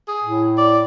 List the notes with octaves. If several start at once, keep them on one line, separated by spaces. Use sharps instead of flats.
G#4
A2
D5